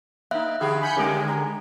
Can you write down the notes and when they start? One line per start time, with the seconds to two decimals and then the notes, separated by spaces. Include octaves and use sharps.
0.31 A#3 D#4 E5 F5 F#6
0.61 D3 G4 G#4 B5
0.82 G#5 B5 G6 C#7
0.96 D3 D#3 G#3 C#4 G4 A#4
1.28 A#5